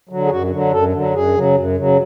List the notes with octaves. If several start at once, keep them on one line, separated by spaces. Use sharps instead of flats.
D3 F#3
G#4
F#2 F#4
D3 F#3
F#2 A4
D3 F#3
F#2 G#4
C#3 F#3
F#2
C#3 F#3